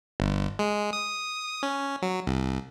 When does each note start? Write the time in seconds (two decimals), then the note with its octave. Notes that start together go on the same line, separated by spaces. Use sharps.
0.20 G1
0.59 G#3
0.93 D#6
1.63 C#4
2.02 F#3
2.27 C2